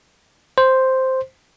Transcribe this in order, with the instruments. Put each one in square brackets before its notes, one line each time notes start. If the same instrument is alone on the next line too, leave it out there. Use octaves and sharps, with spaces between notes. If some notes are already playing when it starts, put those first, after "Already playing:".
[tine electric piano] C5